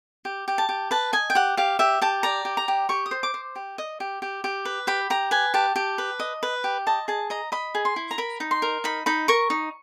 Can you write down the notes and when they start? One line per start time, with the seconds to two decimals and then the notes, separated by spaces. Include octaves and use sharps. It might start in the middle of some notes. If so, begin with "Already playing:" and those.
0.25 G4
0.48 G4
0.58 A5
0.69 G4
0.91 B4 A5
1.13 D#5 G#5
1.30 G5
1.35 G4 F#5
1.57 G4 F5
1.79 G4 E5
2.02 G4 A5
2.23 D5 A#5
2.45 G4
2.57 A#5
2.68 G4
2.89 G4 C#6
3.06 D#6
3.11 C5
3.23 D6
3.34 C5
3.56 G4
3.78 D#5
4.00 G4
4.22 G4
4.44 G4
4.65 B4
4.87 G4 B5
5.10 G4 A#5
5.31 B4 G#5
5.54 G4 A5
5.76 G4
5.98 B4
6.20 D#5
6.43 B4
6.64 G4
6.87 D#5 A5
7.08 G#4 A5
7.30 D#5 A#5
7.52 D#5 B5
7.75 G#4
7.85 C6
7.96 E4
8.11 A#5
8.18 A#4 B5
8.40 D#4
8.51 C6
8.62 A#4
8.84 D#4 B5
9.06 D#4 B5
9.28 A#4 C#6
9.50 D#4